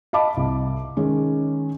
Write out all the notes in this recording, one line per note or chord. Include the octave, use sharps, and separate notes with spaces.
D#5 F5 A5 B5 D6
C2
D#3 G#3 C#4